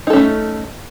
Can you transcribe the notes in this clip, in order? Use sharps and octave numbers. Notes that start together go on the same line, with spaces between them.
A3 C#4 D#4 A4